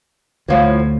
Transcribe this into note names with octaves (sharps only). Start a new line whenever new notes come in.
D2 A2 F3 F#3 A3